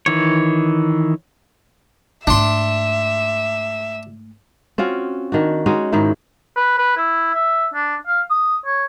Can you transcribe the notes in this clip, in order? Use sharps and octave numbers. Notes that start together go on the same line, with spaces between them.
D#3 E3 C#5
G#2 A3 D4 E5 C6
C4 C#4 F4 F#4
D#3 D4 F#4
G#3 C#4 D#4 F#4
G#2 D#3 D#4 E4
B4
B4
E4
E5
D4
F5
D#6
C#5